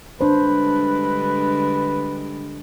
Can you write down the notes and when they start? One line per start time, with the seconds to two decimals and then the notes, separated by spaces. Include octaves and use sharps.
0.21 D3 G3 G#3 D4 B4 C5